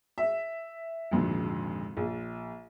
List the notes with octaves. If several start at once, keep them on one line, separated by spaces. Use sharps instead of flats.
E5
G#1 F2 A#2 D3
A#1